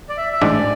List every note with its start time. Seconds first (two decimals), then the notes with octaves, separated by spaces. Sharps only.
0.09 D5
0.17 E5
0.33 E5
0.41 A1 G#2 G#3 D4 D5